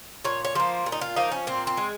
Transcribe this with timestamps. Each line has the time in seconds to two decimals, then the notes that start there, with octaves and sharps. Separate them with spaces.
0.24 A#2 C#5
0.45 C#5
0.55 F3 A#3 C5
0.86 A#2
0.92 D#4
1.01 F4
1.16 F3 A#3 D#4
1.32 C#4
1.47 A#2 C4
1.67 C4
1.77 G#3